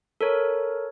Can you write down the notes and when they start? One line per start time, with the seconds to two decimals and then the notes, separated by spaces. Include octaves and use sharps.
0.21 A4 A#4 C#5